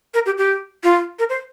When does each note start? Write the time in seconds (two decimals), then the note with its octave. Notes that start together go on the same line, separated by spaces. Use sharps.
0.14 A#4
0.26 G4
0.38 G4
0.84 F4
1.19 A#4
1.29 C5